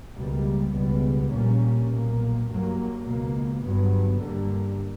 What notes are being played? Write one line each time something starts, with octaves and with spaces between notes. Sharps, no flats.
C#2 B2 G3 A#3
C#2 B2 G3 B3
A#1 A#2 G3 A#3 C#4
B1 A#2 A#3
G2 F#3 A#3
C#2 B2 A#3
G1 G2 F#3 B3
G2 D3 G3 A#3